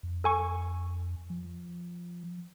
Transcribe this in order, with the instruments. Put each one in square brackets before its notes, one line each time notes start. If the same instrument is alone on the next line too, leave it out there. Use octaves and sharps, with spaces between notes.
[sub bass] F2
[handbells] A4 G#5 C#6
[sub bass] F3